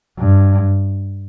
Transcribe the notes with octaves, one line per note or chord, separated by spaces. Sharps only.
G2